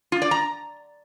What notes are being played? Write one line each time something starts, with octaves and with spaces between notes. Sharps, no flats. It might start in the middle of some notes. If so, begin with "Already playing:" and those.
F4
D5
A#5